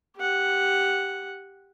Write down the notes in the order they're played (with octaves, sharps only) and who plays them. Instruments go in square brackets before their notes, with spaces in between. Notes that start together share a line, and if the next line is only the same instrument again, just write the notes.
[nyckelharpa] G4 F#5